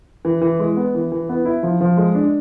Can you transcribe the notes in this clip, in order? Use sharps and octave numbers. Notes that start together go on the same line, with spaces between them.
E3
E3
G#3
B3
E3
E3
B3
E4
F3
F3
G#3
D4